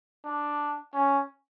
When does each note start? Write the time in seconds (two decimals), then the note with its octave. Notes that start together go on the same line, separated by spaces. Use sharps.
0.25 D4
0.94 C#4